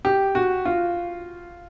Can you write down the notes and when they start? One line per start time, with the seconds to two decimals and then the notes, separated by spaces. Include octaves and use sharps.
0.05 G4
0.35 F#4
0.65 F4